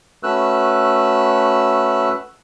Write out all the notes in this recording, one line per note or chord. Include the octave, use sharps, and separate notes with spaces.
A3 C#4 F#4 B4 E6 F#6